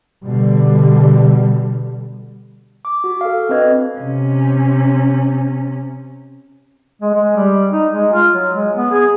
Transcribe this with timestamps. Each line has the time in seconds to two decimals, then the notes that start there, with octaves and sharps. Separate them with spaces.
0.24 B2 D3 G3
2.85 D6
3.04 F#4
3.21 A4 F5
3.49 C4 D4 B4 D#5 G#6
3.99 C3 C#4
7.02 G#3
7.14 G#3
7.36 G3
7.71 D#4
7.91 G#3
8.13 F4
8.34 F#3
8.54 G#3
8.76 B3
8.91 G#4